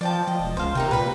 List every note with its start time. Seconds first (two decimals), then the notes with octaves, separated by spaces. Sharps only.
0.01 F3 D5 G5 A5
0.27 F3 D#5
0.40 E1
0.57 C#2 C5 F5
0.75 C3 D#4 A#4 G5
0.91 A#2 B4 B5